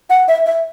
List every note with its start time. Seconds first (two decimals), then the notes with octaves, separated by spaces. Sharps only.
0.10 F#5
0.28 E5
0.46 E5